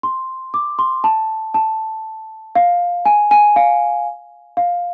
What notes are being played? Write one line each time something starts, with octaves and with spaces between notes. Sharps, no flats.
C6
D6
C6
A5
A5
F5
G#5
G#5
F5
F5